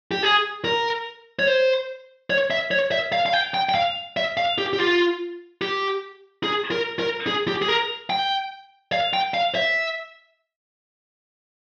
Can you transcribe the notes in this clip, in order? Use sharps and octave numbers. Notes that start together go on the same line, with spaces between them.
G4
G#4
A#4
C#5
C5
C#5
E5
C#5
E5
F5
F5
G5
G5
G5
F5
E5
F5
G4
G4
F4
G4
G#4
A#4
A#4
G#4
G4
G#4
A#4
G5
F5
G5
F5
E5